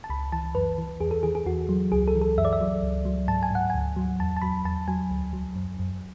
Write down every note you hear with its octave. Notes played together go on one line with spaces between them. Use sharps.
A5
C#2 B5
E3 A5
F#2 B4
E3
E2 G#4
A4
E3 G#4
G#4
E2 F#4
F#3
C#2 G#4
A4
E3
A4
F#2 E5
D5
E5
F#3
C#2
F#3
G#2 A5
G#5
G#2 F#5
D2 G#5
F#3
E2 A5
A5
F#3 B5
E2 A5
F#3 G#5
D2
F#3
F#2
F#2